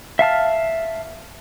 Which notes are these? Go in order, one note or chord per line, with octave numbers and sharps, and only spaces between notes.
E5 F5 A5 F6